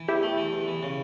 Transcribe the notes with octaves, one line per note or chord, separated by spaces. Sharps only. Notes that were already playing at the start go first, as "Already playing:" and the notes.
Already playing: E3
E2 E4 G4
A3
E3
E2
E3
C#3